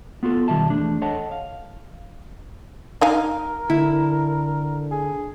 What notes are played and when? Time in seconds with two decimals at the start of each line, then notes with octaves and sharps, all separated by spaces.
0.23 B3 F4 F#4 A4
0.48 B1 D#3 G3 E5 A5
0.70 E2 G2 A3 D4
1.02 A4 C#5 D#5 F#5 A5
1.32 F5
3.01 D#4 A#4 F5 G#5
3.70 D3 E4
4.91 G#4